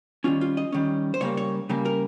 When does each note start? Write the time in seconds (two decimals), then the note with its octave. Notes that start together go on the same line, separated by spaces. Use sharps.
0.24 D#3 G3 C#4 F4
0.41 F4
0.57 D#5
0.72 D#3 G3 C#4
1.14 C5
1.21 C#3 G3 A#3 C#5
1.37 C#5
1.69 C#3 G3 A#3
1.85 A#4